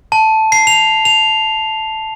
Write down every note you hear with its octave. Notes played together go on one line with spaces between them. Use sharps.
A5
C7
F7
F7